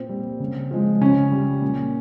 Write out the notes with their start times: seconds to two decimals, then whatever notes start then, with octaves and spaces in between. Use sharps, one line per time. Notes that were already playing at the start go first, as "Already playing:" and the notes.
Already playing: A#2 C4
0.09 G3
0.40 C#3
0.71 F3 G#3
1.01 C#3 C#4
1.32 G3
1.62 A#2